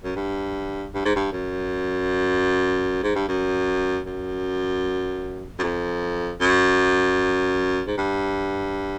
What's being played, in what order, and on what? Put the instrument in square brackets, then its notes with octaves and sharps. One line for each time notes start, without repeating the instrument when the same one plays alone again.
[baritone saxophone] F#2
G2
G2
G#2
G2
F#2
G#2
G2
F#2
F#2
F#2
F2
F#2
G#2
G2